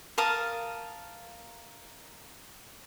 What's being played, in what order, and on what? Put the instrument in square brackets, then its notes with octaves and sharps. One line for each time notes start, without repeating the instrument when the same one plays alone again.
[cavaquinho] A#4 F5 A5 D#6